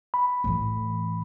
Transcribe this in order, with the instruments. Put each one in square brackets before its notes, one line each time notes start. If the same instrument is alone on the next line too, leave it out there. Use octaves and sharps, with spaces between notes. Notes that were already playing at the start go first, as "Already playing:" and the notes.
[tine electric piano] B5
[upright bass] A2 E3